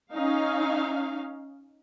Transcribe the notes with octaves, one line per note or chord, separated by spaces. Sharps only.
C#4 D#4 F5